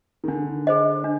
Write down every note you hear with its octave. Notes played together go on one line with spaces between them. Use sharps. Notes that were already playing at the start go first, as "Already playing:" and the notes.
D#3
D3 D4
G#4 C5 D#5
D4